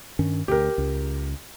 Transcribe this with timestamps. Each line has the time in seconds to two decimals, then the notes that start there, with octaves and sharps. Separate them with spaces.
0.19 G2 D#3 C#4
0.48 D2 G4 A#4
0.78 C#2